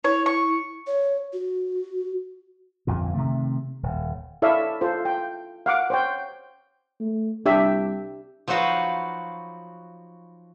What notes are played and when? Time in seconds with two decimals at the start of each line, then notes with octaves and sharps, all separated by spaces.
0.04 E4 C#5
0.26 C#6
0.87 C#5
1.33 F#4
2.87 G1 F2 A#2
3.15 C3 D#3 A3
3.83 D#1
4.42 E4 A4 C#5 D5 E5 F5
4.81 F4 A4 C5
5.05 G5
5.66 F5 F#5 D6
5.90 C5 C#5 G5
7.00 A3
7.46 C2 D4 G4 E5
8.48 F3 F#3 D#4 F#4 B4 F5